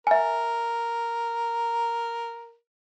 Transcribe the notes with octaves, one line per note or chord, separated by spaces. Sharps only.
A#4 E5 G#5